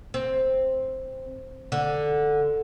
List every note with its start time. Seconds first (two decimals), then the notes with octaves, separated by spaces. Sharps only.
0.14 C4
1.72 D3